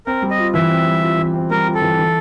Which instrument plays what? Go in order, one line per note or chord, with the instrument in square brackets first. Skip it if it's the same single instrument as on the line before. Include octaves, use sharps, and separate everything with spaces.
[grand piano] C4 [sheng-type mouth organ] A#4
[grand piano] G3
[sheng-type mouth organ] D#5
[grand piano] F4
[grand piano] E3 [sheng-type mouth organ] E5
[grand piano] C4
G3
F4
E3
C4
[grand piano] G3 [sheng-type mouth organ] A#4
[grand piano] F4
[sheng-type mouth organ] A4
[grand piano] E3
E3